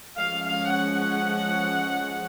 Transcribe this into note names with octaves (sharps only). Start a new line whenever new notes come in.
F3 G#3 C#4 F5
F5
F#5